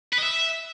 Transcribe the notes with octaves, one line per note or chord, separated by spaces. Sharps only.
B4
D#5
E5